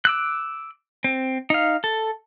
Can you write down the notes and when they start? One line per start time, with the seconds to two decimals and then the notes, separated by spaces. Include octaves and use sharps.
0.05 D6 E6 F#6
1.04 C4
1.50 D#4 F5
1.84 A4